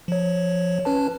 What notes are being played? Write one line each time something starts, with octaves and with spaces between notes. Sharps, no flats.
F3 C#5
C#4 B4 A5